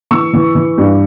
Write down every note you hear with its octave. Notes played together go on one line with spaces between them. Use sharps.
E3 C#6 E6
E3
E3
G2